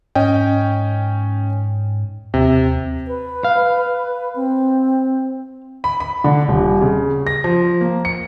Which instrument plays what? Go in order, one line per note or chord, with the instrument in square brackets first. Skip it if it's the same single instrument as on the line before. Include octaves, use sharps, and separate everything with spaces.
[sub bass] G#2 [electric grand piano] C#4 D#5 G5
[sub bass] D#2 [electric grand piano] C3
[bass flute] B4
[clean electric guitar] F5
[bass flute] C4
[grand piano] B5
B5
D3
D#1
C#3
A#6
F3
A#3
C#7